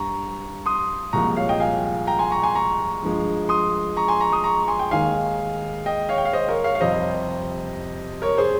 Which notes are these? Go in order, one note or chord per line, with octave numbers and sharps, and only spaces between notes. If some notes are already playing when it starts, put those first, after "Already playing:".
Already playing: G2 G3 A#5 C#6
C6 D#6
C2 A#2 F3 G#3 A#5 C#6
C#5 F5
D#5 G5
F5 G#5
G5 A#5
G#5 C6
A#5 C#6
G#5 C6
A#5 C#6
G2 F3 G#3
C6 D#6
A#5 C#6
G#5 C6
A#5 C#6
C6 D#6
A#5 C#6
C#6
G#5 C6
G5
D#2 D#3 G#3 F5 G#5
D#5 G5
C#5 F5
G5
F5
C5 D#5
A#4 C#5
C#5 F5
F5
F2 C3 G3 C5 D#5
A#4 C#5
G#4 C5